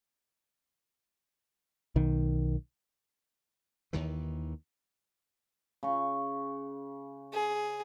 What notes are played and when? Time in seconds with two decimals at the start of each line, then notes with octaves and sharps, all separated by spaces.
1.96 B1 D#3
3.93 D#2 D#3 E3
5.83 C#3 C#6
7.33 G#4